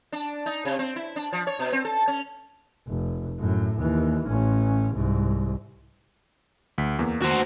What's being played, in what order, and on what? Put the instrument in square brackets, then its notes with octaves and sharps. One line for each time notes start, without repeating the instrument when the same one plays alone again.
[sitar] D4
D#4
C3
C4
E4
D4
F3
C#5
B2
C4
A4
C#4
[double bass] F1
F#2 A2
D#2 E3
A1 C#4
C2 G#2
[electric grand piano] D2 B6
E2 A#3
[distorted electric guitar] F#4 C5